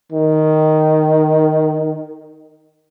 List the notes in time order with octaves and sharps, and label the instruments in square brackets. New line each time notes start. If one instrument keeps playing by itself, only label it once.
[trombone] D#3